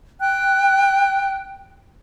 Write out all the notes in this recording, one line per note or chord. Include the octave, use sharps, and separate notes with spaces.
G5 F#6